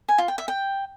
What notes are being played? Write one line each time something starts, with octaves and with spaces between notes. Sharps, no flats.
G#5
F4
G5
E5
G5